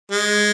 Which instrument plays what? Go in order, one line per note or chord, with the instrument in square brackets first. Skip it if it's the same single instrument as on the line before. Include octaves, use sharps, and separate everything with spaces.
[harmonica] G#3